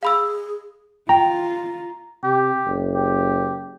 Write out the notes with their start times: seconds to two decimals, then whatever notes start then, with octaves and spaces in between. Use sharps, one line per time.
0.03 G#4 F5 B5 E6
1.09 F4 G5 A#5
2.23 C3 G4
2.66 F#1
2.95 G4